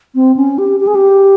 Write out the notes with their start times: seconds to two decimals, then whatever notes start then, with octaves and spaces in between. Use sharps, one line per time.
0.15 C4
0.36 C#4
0.58 G4
0.80 G4
0.87 G#4
0.95 G4